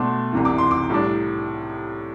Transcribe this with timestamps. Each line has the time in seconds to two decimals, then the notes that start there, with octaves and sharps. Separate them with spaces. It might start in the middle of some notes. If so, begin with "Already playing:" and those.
Already playing: B2 A3 D4 C6
0.33 C2 C3 E3
0.45 D6
0.58 C6
0.71 D6
0.90 A2 G3 D4